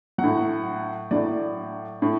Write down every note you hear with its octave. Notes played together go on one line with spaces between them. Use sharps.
F#3 F#5
A2
A2 F#3 D5
A2